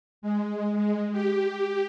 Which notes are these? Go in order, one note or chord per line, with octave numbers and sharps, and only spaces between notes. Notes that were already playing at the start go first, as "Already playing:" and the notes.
G#3
G#3
G4